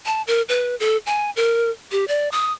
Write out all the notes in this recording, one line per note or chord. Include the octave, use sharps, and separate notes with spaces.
A5
A#4
B4
A4
G#5
A#4
G4
D5
D#6